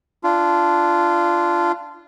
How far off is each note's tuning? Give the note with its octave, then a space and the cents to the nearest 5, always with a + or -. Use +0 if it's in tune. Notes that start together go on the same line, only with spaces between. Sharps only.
D4 +0 F4 -15